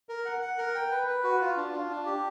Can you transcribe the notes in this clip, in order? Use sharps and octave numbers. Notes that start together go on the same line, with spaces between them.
A#4
F#5
F#5
A#4
G5
B4
B4
F#4
F4
D4
F4
D4
G4